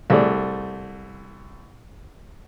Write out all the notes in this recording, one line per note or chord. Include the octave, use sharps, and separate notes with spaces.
C2 A3 G#4 D5